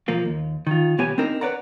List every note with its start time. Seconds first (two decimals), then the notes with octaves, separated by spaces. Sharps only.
0.08 B1 F3 A#3 F4
0.25 D#2
0.67 D#3 F4
0.98 B1 B3 G4 C#5 G#5
1.18 C4 D4 D#4 A#4
1.41 B4 C#5 D5 F#5 A#5